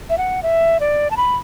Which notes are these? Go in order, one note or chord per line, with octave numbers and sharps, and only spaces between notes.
E5
F#5
E5
D5
A5
B5